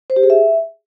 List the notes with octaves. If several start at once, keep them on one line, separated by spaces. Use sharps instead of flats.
C5
G4
G#4
E5